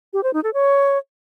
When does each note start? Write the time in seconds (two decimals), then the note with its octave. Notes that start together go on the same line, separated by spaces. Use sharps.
0.13 G4
0.23 C5
0.34 D#4
0.44 A4
0.54 C#5